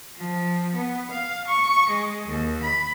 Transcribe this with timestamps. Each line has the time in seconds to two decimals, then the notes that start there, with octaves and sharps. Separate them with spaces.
0.15 F3
0.74 B3
1.10 F5
1.47 C#6
1.88 G#3
2.28 D#2
2.62 B5